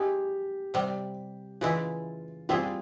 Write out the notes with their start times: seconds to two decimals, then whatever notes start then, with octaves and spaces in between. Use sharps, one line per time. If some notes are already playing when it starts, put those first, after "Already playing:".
Already playing: G#3 C#4 E4 G4 G#4
0.74 C3 G3 C4
1.61 C#3 E3 G#3 E4 F4
2.49 G3 C4 E4 F4 G#4